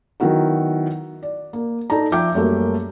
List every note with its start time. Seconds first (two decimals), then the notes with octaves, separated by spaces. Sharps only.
0.20 D#3 F#3 B3 E4 F#4 A#4
1.23 D5
1.53 A#3
1.90 D#4 A4 D5 A5 A#5
2.12 F3 E5 G5 D6 G6
2.35 F#2 G3 A3 A#3